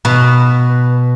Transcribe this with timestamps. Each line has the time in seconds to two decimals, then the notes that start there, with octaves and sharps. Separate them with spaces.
0.05 B2 B4